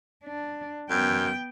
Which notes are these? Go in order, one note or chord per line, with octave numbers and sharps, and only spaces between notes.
D4
F#2 B3 G5